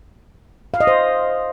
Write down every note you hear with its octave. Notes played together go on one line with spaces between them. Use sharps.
F5
D#5
C5